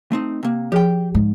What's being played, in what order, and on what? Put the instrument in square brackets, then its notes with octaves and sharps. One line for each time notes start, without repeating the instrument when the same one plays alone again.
[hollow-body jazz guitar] A3 C4 D#4
C3 A#3
[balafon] F3 G#4 [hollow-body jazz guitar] G4 G5
[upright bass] G#2